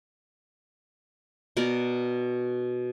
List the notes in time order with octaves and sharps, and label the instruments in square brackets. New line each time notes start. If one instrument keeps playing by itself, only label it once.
[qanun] B2 A#4 D5